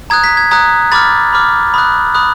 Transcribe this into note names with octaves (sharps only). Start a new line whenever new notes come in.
A#5 D#6 F#6 G#6
B6
G#6
A#5 D#6 F#6 G#6
B5 D6 F6 A6
B5 D6 F6
B5 D#6 F#6
B5 D#6 F#6